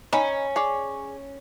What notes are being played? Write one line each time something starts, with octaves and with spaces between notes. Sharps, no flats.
C#4 D#4 B5
G#4 C#5 D5